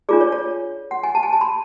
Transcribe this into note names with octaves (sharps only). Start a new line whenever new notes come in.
D4 F4 G#4 D5
C#5
C#5
F#5
G#5
A5
G#5
A5
B5